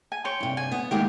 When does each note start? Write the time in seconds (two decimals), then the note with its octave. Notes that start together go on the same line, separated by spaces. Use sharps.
0.12 G#5
0.25 C#5 G5 C6
0.40 G2 C3
0.57 G#5
0.72 B3
0.91 D#3 G#3 A#3 G4